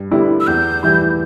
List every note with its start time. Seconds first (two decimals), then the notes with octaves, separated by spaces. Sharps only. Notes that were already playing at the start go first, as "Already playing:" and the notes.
Already playing: G2
0.11 D3 G3 B3 E4
0.40 E6
0.47 E2 G6
0.83 E3 G3 E4